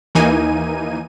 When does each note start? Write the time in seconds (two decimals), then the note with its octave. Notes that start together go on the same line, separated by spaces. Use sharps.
0.15 D#2 E3 A#3 D#4 G#5 D#7